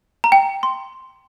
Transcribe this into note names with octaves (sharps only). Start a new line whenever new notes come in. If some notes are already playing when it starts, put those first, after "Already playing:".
A#5
G5
C6